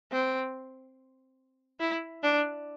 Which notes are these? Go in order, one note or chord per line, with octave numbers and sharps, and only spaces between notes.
C4
E4
D4